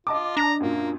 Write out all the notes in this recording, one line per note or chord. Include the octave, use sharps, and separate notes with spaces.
F4 D#5 A5 D6
D4 A#5
F#2 A#2 A#3